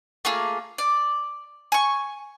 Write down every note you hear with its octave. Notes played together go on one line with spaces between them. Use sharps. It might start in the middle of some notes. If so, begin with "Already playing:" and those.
A3 A#3 F4 G#4
D5
G#5 C#6